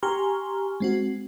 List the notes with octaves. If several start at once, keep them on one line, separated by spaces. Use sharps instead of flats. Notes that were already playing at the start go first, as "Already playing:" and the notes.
G4 G#5 A#5 C6 C#6 F6
G#3 C4 F#4